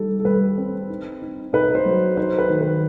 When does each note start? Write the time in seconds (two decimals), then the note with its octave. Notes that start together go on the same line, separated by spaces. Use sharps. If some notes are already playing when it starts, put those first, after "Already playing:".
Already playing: G3 D#4 G4 A4
0.20 A4
0.25 G3 B4
0.58 C4
0.89 D#4
1.22 D#4
1.53 D#4 B4
1.75 C5
1.85 F#3
2.17 D#4 C5
2.38 B4
2.50 D#3
2.61 B4